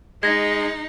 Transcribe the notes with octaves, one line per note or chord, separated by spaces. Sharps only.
G#3 D#4 G#6 A#6